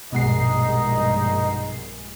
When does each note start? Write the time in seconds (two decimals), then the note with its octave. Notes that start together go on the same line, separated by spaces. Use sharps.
0.13 A#1 G2 B2 G#3 D#4 D#5 F#5 C7